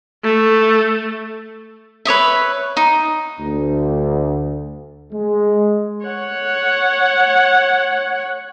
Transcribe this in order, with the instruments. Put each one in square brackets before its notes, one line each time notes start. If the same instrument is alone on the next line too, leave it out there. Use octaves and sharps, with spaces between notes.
[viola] A3
[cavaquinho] B4 C#5 D#5 E5
D#4
[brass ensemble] D2
G#3
[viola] C#5 F#5